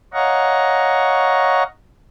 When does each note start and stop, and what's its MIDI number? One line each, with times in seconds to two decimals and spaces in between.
0.14 1.63 73
0.14 1.63 75
0.14 1.63 77
0.14 1.63 78
0.14 1.63 82
0.14 1.63 85